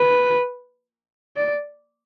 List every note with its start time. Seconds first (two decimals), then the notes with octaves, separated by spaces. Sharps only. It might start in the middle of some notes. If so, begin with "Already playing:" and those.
Already playing: B4
1.36 D5